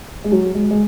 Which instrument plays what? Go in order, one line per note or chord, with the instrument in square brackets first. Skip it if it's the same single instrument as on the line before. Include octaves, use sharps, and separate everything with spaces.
[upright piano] G#3
F#3
G#3
G#3